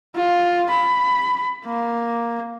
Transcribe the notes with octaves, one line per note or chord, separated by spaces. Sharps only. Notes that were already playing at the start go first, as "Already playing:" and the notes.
F4
B5
A#3